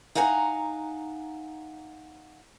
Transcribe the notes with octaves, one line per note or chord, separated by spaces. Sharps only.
D#4 F5 F#5 G#5 A#5